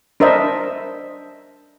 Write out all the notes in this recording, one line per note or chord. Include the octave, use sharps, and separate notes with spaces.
D4 A#4 C5 D#5 E5